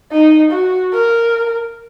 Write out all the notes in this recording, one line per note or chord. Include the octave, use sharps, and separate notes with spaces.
D#4
F#4
A#4